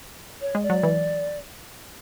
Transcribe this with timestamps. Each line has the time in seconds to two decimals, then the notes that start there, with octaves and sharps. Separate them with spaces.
0.40 C#5
0.55 G#3
0.62 D5
0.70 F#3
0.83 E3